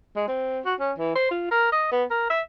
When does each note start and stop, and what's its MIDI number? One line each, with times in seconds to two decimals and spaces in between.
0.16 0.27 56
0.28 0.60 60
0.65 0.74 66
0.80 0.93 61
0.98 1.14 52
1.15 1.30 72
1.31 1.48 65
1.51 1.68 70
1.72 1.88 75
1.92 2.04 59
2.10 2.28 70
2.30 2.40 76